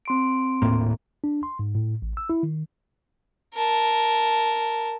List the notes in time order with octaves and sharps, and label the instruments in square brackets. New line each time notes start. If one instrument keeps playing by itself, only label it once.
[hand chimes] C4 C6 D7
[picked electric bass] D#1 A2 A#3
[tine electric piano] D4
C6
G#2
A2
A1
E6
E4
D#3
[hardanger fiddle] A#4 A5